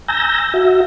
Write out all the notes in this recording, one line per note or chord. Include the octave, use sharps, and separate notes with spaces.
G#5 A#5 E6 G6 A#6
F#4 E5